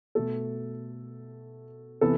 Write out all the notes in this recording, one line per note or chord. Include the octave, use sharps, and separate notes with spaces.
B2 A3 A4
C3 E3 B3 A4